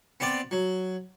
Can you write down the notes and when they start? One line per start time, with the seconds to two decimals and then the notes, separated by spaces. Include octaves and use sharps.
0.20 B3 C4 D5
0.51 F#3